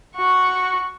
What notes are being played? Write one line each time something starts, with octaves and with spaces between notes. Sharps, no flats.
F#4 C#6